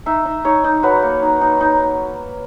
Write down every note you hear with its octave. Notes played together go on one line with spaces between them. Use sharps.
D#4 E5
D#4
D#4 C#5
D#4
F#3 B4
A#3
D#4
D#4
D#4